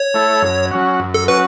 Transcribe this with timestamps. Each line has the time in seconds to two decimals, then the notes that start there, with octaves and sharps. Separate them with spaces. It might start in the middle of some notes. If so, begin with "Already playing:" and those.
Already playing: C#5
0.14 A3 E4 A4
0.42 F#2
0.71 F#3 C#4 F#4
1.00 F#2
1.14 A4
1.28 F#3 C#4 F#4 B4